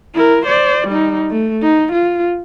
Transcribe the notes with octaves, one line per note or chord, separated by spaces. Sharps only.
E4 A#4
C5 D5
G3 D#4
A3
D#4
F4